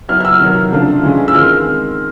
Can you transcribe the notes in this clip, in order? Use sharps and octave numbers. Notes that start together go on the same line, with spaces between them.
F#3 B3 E4 F6
F6
E6
C3 D#3 F#3 F6
C#3 F3 A3 D4 F4
E3 G#3 C#4 F4
E6
D#3 G#3 C4 F6